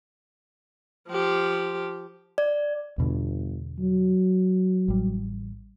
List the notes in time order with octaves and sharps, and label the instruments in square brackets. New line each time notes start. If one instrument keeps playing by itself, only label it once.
[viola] F3 G4
[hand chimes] D5
[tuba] G1 [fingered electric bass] E2 B2 D3
[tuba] F#3
[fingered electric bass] A1 G3